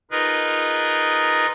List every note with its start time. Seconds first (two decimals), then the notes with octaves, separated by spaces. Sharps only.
0.11 D#4 F4 G#4 A#4 B4 D#5